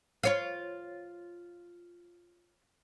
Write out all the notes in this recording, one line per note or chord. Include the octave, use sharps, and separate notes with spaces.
F4 C#5 F5